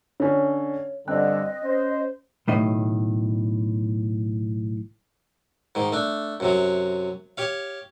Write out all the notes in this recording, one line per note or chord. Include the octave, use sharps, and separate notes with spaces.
D3 C#4 C#5
G2 D3 C4 D#5 F#6
C#4 C5
B1 A2 D#3 D#5
G#2 D#3
A3 D4
F#2 C3 F#3
G4 C#5 F5